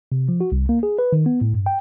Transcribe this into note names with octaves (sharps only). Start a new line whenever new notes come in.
C3
F3
F#4
C2
A#3
G#4
B4
D#3
B3
A2
G2
G5